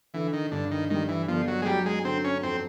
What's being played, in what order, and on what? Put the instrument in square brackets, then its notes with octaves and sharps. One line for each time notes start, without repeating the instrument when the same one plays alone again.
[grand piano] D3 [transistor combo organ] E3
[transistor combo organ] D#3
[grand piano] G2 [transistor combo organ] D3
[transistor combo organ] D#3
[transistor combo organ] D#3 [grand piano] G3
[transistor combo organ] E3
[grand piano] G1 [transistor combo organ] F3
[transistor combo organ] F#3
G#3
[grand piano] F#3 [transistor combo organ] G3
[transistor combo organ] G#3
[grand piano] D3 [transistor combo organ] C4
[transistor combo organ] C#4
[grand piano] F2 [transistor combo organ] C4